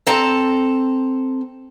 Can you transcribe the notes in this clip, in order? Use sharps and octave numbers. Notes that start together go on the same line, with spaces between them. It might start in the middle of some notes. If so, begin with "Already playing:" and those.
C4 A4 A5 A#5